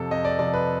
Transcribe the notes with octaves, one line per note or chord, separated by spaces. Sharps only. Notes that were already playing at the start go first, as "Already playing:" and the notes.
Already playing: F2 C3 F3 A4
F2 D#5
D5
C3 F3 D5
B4